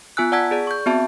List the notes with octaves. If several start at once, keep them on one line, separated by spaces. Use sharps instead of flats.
B3 F4 G#5 E6 F#6
D5 F#5 A5 E6 G#6 B6
G#4 D5
C#6 G6
B3 C4 F#4 E5 A5